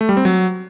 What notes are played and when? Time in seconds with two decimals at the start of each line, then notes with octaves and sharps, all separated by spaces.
0.01 A3
0.09 G3
0.17 C4
0.25 F#3